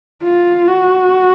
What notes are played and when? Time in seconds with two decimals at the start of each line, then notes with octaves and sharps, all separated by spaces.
0.23 F4
0.67 F#4